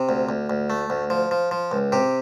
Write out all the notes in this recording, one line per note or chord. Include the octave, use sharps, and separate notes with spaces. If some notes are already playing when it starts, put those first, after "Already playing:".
Already playing: C3
D2
D2
D2
A3
D2
F3
F3
F3
C#2
C3 G4